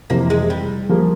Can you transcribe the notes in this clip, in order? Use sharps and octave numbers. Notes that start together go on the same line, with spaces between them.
F2 C3 E3 A#3
G#3
G3
F3 A#3 F4 G#4